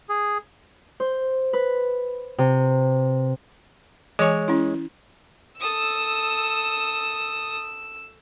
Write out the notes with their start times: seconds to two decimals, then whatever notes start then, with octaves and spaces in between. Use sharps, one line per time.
0.09 G#4
1.00 C5
1.53 B4
2.38 C3
4.19 E3 G#3 C#5 G#5
4.48 C#4 E4
5.60 A4 D#6 E6